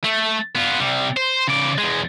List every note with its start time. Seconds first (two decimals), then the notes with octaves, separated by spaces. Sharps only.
0.04 A3
0.55 B3 F4
0.80 C3 G3
1.17 C5
1.48 C#3 D5
1.78 E2 G#3